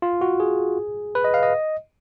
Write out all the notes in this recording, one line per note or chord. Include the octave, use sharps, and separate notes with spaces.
F4
F#4
G#4
B4
D#5
F5
D#5